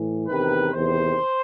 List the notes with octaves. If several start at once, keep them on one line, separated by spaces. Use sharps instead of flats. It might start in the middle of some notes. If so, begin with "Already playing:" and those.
Already playing: A2 E3
E2 C3 D#3 B4
E2 C3 D#3 C5